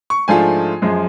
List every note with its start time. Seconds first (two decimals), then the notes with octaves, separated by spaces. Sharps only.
0.10 C#6
0.28 G#2 F3 A3 D4 F4 G#5
0.82 F#2 F3 G#3